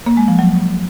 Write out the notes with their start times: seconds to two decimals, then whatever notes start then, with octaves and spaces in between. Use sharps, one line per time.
0.06 A#3
0.17 G#3
0.28 F3
0.39 F#3